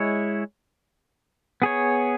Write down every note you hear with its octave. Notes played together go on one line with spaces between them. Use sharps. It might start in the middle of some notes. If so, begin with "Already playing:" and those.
Already playing: G#3 E4 C#5
B3 G#4 C#5